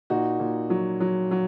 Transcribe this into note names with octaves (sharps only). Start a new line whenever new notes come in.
A#2 D#4 F#4
A#2
F#3
F#3
F#3